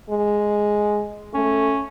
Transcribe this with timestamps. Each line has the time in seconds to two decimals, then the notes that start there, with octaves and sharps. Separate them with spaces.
0.10 G#3
1.34 A3 C#4